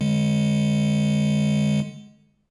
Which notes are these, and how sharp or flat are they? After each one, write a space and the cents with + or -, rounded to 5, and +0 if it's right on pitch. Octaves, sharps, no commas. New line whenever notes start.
D3 +15 G#3 +0